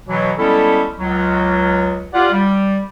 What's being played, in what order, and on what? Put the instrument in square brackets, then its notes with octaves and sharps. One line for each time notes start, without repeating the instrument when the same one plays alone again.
[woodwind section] B2 E3 F#3
G3 G#3 B3 C#4 E4 A4
C#2 F#3
F4 G4 D5 F#5
G3